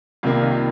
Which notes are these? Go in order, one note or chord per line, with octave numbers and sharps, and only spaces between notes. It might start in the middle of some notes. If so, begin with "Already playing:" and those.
C2 C3 D#3 A#3 F4
D#4
F4